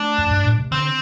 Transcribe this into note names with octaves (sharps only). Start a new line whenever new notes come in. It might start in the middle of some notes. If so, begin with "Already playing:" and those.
Already playing: A3 D4
F2
G2
A2
C3
D3 C4